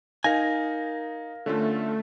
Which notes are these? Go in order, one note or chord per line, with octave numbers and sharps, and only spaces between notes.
D#4 A#4 F5 G#5 A#6
D3 A3 C#4 F4